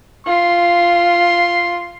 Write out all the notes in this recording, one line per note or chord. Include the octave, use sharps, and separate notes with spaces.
F4 C6